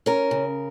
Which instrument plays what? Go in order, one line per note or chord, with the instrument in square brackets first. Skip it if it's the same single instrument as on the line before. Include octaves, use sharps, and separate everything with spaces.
[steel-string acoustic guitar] C#4 A#4
C#3